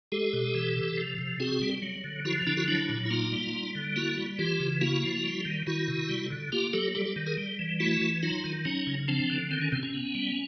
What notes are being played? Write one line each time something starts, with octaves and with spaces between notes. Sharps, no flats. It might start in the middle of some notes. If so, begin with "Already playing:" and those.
G#3 G4 A4
B2
E3
C3
F3
C3
C4 F#4 G#4
G3
F#3
D3
F3 E4 F#4
D3 D4 E4
E4 F#4
F#3 D4 E4
A#2
E4
A#3 D#4 F4
G3
G3
D3
A#3 E4 F#4
G3
E3 F4 G4
C#3
A#3 E4 F#4
F3
G3
D#3
D#3 E4 F#4
C3
G3
D3
A#3 F4 G4
F#3 G4 A4
G3 G4 A4
G4 A4
D#3
G#4 A#4
G3
E3
A3 E4 F#4
E3
F#3 D#4 F4
D#3
F#3 C#4 D#4
C#3
F3 C4 D4
D3
D#3 C4
C#4
C3 C4
C#4
B3
G3